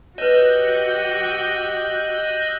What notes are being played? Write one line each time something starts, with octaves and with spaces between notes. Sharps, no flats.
F#4 G4 B4 C#5 D#5 E6 F#6 G6